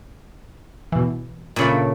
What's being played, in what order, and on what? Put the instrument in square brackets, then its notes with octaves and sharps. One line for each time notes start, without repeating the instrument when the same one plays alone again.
[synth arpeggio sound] B2 E3
[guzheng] A#2 C#3 A3 [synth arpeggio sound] B5 D7